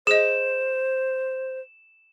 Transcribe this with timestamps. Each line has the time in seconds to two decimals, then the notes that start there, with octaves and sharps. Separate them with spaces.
0.07 G#4 C5 D#5 E7